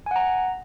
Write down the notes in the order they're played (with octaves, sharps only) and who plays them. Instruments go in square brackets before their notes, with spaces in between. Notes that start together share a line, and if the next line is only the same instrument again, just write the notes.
[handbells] G#5
F#5
A#5